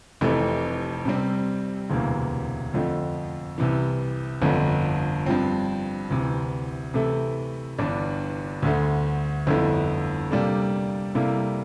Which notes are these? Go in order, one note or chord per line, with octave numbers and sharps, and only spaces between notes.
F1 F2 C3 E3 A3
C3 G3 C4
E1 D2 C3 E3 A#3
F2 D3 F3 A3 C4
C2 C3 E3
G1 F2 D3 F3 A3
G2 F3 C4
D2 C3 E3
C3 E3 A3 E4 A4
G1 G2 E3 G3 D4
D2 D3 A3
G1 F2 D3 A3 E4
C3 G3 A#3 D4 A4
C3 G3 A#3 E4 A4